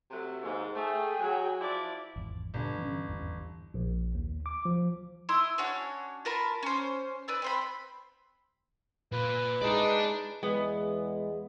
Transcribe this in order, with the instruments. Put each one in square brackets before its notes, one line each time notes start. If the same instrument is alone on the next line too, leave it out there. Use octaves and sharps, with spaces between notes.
[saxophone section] C3 F#3 A3
D#2 G#2
[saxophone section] A3 [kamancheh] G#4 G5
[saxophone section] F#3
F3 E4 D5
[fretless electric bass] G#1 E2
[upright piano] G1 D3 [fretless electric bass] A#2
[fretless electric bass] E3 C#4
G#1 E2 E3
[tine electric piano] A#1
D#2
D6
F3
[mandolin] E4 C6 D#6 E6
C#4 D4 F#4 C#5
F4 A#4 A5 B5
C#4 C5
B4 D5 E6
C4 C5 B5
[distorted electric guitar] A#2 [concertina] B4
[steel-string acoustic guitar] G#3 E4 G#4 [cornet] D#4 [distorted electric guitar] D5 A5
[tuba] E2 [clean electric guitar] G#3 [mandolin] B3